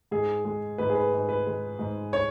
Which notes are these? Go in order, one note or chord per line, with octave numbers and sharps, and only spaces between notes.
G#2 G#4
G#3
G#2 B4
G#4
B4
G#2
B4
G#3
G#2
C#5